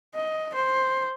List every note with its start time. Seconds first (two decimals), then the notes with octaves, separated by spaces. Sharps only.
0.15 D#5
0.54 C5